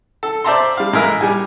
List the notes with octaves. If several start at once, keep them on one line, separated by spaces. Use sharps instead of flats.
A4
C5 D5 E5 A5 A#5 C6
G3 F5
A1 G#3 E4 G#4 A#4 E5
G3 G#5